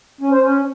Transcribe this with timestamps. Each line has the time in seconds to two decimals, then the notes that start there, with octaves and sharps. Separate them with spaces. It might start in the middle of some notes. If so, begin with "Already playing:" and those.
0.21 C#4
0.31 C5
0.41 C#4